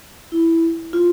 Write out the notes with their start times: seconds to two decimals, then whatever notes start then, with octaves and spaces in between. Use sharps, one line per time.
0.32 E4
0.93 F4